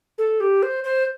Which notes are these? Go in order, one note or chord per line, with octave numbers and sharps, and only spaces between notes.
A4
G4
C5
C5